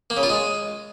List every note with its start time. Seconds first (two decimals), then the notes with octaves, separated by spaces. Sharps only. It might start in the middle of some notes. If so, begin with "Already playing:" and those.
0.10 A#3
0.17 C#3
0.23 F4
0.29 G#3